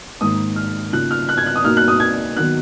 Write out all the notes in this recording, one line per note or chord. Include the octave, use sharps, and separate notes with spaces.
G#2 D#3 A#3 D#6
F6
C#3 F3 A#3 D#4 F#6
F6
F#6
G#6
F#6
D#6
B2 A#3 D#4 F6
F#6
D#6
G#6
D#3 F#3 B3 D#4 F#6